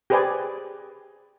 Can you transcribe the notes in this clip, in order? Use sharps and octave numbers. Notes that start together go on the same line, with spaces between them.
G4 G#4 B4 C5 D5 G#5